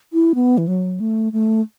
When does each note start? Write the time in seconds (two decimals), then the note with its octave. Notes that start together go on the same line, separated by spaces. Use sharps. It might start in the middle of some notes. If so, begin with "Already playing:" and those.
0.13 E4
0.35 B3
0.58 E3
0.68 F#3
1.00 A3
1.33 A3